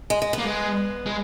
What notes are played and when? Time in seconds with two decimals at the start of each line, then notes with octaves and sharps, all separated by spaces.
0.10 G#3
0.22 G#3
0.33 B3
0.38 A#3
0.46 G#3
1.06 G#3